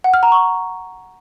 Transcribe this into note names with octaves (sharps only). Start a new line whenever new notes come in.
F#5
F6
A#5
C#6